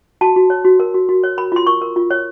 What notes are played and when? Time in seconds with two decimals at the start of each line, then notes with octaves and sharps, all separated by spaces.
0.21 F#4 A5
0.36 F#4
0.50 C#5
0.65 F#4
0.80 A#4
0.94 F#4
1.09 F#4
1.24 C#5
1.38 A#4 B5
1.52 F4 C6
1.67 A#4 C#6
1.81 A#4
1.96 F4
2.11 C#5